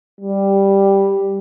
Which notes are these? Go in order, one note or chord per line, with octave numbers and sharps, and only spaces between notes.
G3